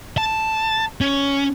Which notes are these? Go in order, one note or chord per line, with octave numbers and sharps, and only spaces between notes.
A5
C#4